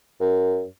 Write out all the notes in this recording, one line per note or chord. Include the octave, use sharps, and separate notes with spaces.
F#2